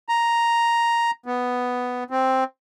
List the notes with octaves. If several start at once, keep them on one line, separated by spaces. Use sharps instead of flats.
A#5
B3
C4